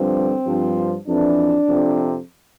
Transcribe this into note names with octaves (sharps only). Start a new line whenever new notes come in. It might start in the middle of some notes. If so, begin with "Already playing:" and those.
Already playing: G2 D3 F3 C4
G2 F3
F2 E3 D4
F2 C3 F3